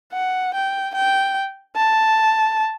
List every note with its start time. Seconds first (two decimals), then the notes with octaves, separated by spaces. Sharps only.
0.13 F#5
0.55 G5
0.95 G5
1.77 A5